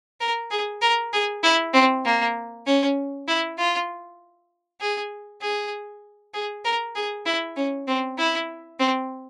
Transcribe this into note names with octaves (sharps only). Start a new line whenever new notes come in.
A#4
G#4
A#4
G#4
E4
C4
A#3
C#4
E4
F4
G#4
G#4
G#4
A#4
G#4
E4
C#4
C4
E4
C4